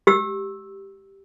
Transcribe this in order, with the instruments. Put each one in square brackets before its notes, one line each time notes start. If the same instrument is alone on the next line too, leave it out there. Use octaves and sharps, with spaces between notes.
[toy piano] G4 E6